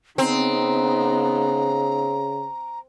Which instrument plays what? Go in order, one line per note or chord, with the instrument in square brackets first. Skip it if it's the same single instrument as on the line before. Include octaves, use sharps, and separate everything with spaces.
[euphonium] C#3 [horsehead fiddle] B3 D#4 [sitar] C4 [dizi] A#5